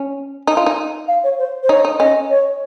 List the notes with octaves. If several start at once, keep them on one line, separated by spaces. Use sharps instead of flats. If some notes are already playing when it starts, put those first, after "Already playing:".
Already playing: C#4
D#4
F4
D#4
F5
C#5
C5
C5
D#4 C#5
D#4
C#4 D#5
C#5